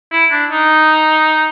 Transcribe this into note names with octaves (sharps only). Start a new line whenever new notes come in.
E4
D4
D#4